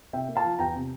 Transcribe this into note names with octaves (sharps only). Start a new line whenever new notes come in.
C3 E5 G5
A#3
F5 A5
F3
E2 G5 A#5
C3